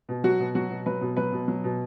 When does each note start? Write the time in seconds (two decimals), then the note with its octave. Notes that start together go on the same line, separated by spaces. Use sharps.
0.09 B2
0.24 F#3 F#4
0.39 B2
0.55 F#3 F#4
0.70 B2
0.86 F#3 B4
1.01 B2
1.17 F#3 B4
1.32 B2
1.48 F#3
1.64 B2